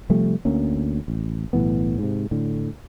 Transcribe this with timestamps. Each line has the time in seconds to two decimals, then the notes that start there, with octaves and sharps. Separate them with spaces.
0.09 C3 F3 G3 A3
0.45 D2 A#3 C#4
1.08 A1
1.53 B1 A2 E3 B3
1.99 G#2 C3
2.31 A2 D3